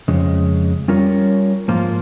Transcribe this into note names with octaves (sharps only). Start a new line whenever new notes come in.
F2 C#3 G#3
G3 C#4 F4 A#4 C#5
G#2 F3 A#3 F4